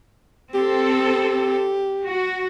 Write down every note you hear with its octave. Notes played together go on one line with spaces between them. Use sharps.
C4 G4 A4
F#4